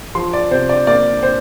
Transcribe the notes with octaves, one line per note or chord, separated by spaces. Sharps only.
F3 C6
D5
C3 C5
D5
A#3 D5
C5